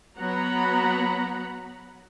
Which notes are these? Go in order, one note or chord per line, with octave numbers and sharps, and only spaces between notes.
F#3 B3 F#5 A#5 B5